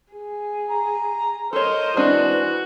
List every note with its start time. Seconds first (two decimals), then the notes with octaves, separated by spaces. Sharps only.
0.12 G#4
0.70 A#5
1.53 A4 A#4 C5 C#5 D#5
1.97 E3 G#3 C4 D4 F#4